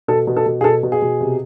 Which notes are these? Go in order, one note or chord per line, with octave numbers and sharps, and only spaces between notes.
B2 A4
B2
A4
B2
G#4
B2 A4
B2
G#4
B2
C3